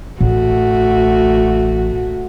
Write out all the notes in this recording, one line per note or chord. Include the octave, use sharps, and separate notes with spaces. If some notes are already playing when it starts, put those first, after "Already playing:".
A1 A3 F#4